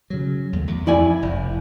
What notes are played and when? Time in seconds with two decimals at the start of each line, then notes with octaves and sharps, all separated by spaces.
0.10 C#3 F#3
0.53 D#2 G#3 A3
0.68 E2
0.87 F2 E4 D5 G#5
1.22 F1